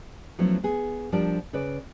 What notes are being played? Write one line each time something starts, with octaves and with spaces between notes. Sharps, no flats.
F3 F#3 A3 B3 C#4 E4
B3 G#4
F3 G3 D4 A#4 D5
C#3 B4 D5